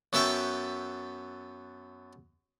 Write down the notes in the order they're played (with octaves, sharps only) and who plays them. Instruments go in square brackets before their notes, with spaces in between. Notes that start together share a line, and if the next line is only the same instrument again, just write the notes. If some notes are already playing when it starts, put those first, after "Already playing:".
[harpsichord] F#2 B3 A4 E5 G5 C#6